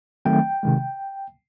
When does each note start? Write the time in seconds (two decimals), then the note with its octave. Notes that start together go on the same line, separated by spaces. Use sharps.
0.25 D#3 F#3 A3 C4 G5
0.63 C3 D#3 G#3